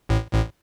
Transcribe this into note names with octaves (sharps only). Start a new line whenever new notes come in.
A1 A2
A1 A2